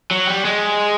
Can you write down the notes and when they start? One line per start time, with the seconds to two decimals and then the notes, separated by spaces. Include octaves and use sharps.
0.11 F#3
0.27 G3
0.45 G#3